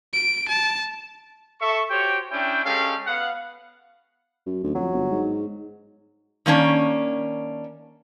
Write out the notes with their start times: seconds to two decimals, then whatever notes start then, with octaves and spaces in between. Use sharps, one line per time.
0.14 D7
0.48 A5
1.61 A4 E5 C#6
1.90 F#4 G4 C5 C#5 G5
2.32 C#4 D4 E4 G5
2.64 G#3 C#4 G4 A4 F5
3.07 B3 F5 F#5
4.46 F#2
4.63 D2
4.75 F2 F#3
4.93 G1
5.11 G#2
6.46 D#3 A#3 C#4 D4